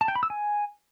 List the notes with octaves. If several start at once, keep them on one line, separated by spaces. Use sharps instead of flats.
A5
G5
B5
E6
G#5